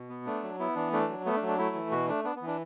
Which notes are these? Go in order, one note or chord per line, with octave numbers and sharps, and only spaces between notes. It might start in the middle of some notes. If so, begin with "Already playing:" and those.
Already playing: B2
B3
A3 D4
F#3
B3 E4
E3 D4
A3 D4
F#3
A3 B3
D4
F#3
D4
A3 E4
E3
B2 F#4
A3 D4
B3 D4
B3
E3
D4